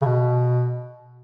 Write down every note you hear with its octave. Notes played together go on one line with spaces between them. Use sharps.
C#3
B2